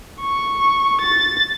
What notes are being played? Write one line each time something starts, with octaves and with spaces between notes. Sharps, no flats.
C#6
A6